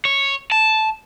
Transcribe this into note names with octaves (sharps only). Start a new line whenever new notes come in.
C#5
A5